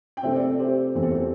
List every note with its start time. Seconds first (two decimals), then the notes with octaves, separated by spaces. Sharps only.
0.17 G5
0.23 C3 A3 C4 C5 E5
0.35 A4 D5
0.59 G4 C5
0.95 E2 E3 A3 C4 C5
1.03 A4
1.11 G4 C5